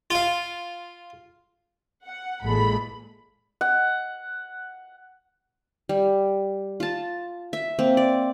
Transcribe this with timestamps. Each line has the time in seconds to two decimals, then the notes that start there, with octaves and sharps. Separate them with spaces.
0.11 F4 F5
2.05 F#5
2.44 A1 A#2 E3 G#3 A4 B5
3.61 F#5
5.89 G3
6.80 F4 A5
7.53 E5
7.79 A#3 C4
7.97 D5